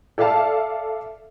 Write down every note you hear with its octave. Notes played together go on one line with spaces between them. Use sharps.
A4 D5 E5 F5 A5